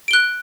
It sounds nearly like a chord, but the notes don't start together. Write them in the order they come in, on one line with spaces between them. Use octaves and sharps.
D7 G7 F#6